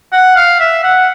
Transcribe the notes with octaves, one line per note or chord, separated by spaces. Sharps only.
F#5
F5
E5
F#5